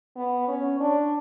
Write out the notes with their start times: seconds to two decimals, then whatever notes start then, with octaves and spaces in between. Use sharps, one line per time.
0.16 B3
0.48 C#4
0.80 D4